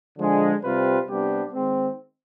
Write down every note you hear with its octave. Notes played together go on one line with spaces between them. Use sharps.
D3 F3 G#3 D4 G#4
C3 G3 C4 F4 B4
C3 G3 B3 D4 G4
D#3 G#3 C4